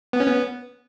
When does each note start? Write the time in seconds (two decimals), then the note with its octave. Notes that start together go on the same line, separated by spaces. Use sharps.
0.13 B3
0.20 C#4
0.27 B3